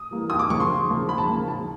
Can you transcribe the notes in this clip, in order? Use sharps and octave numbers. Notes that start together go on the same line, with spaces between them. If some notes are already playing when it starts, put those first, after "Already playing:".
Already playing: D#6
E3 G3 A#3
D#2 D#6
D6
C#3 F3 A#3 C#6
C6
D#2
C#3 F3 A#3
D#2 B5
A5
C#3 F3 A#3
D#2 A5